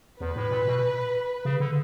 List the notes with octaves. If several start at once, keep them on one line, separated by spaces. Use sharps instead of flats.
E2 B4
A2
A#2
B2
C#3
D3